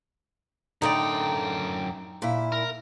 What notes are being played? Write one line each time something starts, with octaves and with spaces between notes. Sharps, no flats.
F#2 A2 D3 D#4 D5 G5
A#2 E4
A#4